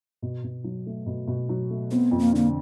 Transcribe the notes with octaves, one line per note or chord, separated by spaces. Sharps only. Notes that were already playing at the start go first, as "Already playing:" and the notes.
B2
B2
F#3
A3
B2
B2
F#3
A3
B3 C4
F2
A#3
D3 A#3